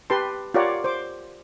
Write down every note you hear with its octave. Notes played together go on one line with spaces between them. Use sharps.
G4 B4 A5 C6
F4 G4 A#4 C#5 D5 F#5
C5 D6